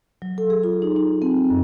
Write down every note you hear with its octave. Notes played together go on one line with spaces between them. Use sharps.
F#3
A4
G#4
F4
D#4
D#4
C4
F#2